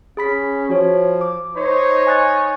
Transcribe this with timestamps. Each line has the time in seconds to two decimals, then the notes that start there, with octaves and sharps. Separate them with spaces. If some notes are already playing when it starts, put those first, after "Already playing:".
0.17 C#4 G#4 B5 B6
0.70 F3 F#4 C#5
1.21 D6
1.56 D#4 C5 C#5
2.07 G#5 F#6 A6